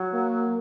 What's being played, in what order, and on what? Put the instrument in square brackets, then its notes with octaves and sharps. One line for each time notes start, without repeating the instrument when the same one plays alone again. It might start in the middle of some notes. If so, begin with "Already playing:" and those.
Already playing: [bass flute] F#3
[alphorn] A#3